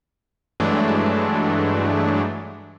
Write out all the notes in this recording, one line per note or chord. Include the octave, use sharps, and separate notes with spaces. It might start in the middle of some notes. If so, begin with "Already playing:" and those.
G2 E3 F#3 G#3 A3 D4